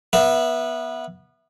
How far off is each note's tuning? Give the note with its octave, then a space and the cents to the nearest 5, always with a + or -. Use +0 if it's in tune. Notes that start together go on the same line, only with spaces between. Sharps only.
B3 -20 E5 +0